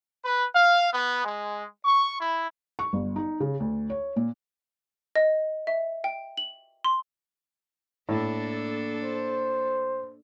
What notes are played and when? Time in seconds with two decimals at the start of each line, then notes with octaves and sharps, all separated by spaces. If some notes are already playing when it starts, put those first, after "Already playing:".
0.24 B4
0.55 F5
0.93 B3
1.23 G#3
1.85 C#6
2.19 E4
2.79 C#6
2.93 G1
3.16 D#4
3.40 C#3
3.60 D2
3.90 C#5
4.16 A#2
5.16 D#5
5.67 E5
6.04 G5
6.37 F#7
6.85 C6
8.09 A2 A#3 D4 A4
9.04 C5